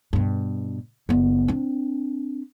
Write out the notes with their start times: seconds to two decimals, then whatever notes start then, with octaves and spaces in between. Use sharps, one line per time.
0.13 G2 B2
1.09 F#1 B3
1.48 C4 D4